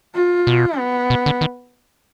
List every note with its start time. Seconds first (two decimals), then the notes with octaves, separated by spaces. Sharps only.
0.15 F4
0.47 B2
0.78 B3
1.10 B2
1.26 D3
1.41 D#3